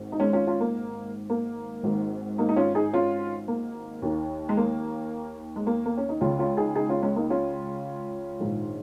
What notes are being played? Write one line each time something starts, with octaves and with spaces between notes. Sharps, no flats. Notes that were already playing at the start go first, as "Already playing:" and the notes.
Already playing: G#1 G#2 D#3
D#4
G#3 C#4
C#4 F4
C#4 F4
A#3
A#3
G#1 G#2 D#3
A#3 D#4
D#4
C#4 F4
D#4 G#4
C#4 F4
A#3
D#2 D#3
G#3
A#3
G#3
A#3
A#3
C#4
D#4
C#2 C#3 C#4 F4
C#4 F4
D#4 G#4
D#4 G#4
C#4 F4
G#3 C#4
A#3 D#4
C#4 F4
A#1 G#2 D#3